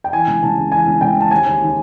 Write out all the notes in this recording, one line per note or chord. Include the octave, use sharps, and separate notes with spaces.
G5
E3 G#5
C#2
C#2 A5
C#3
E3 G#5
C#2
C#2 G5
C#3 A5
D#2 G#5
D#2
D#3